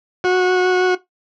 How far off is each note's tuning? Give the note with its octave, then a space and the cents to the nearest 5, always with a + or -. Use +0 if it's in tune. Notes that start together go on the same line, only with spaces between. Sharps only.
F#4 -20